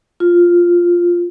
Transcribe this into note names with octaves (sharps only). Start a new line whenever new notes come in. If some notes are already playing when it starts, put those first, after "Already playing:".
F4